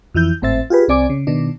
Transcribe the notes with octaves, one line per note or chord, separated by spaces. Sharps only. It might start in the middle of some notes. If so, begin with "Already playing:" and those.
F2 E3 E4 G6
G#1 A2 C4 C5 E5 A6
F4 G4 G#4 B4
C2 C4 D5 G#5 D6
C#3
B2 D#3 D4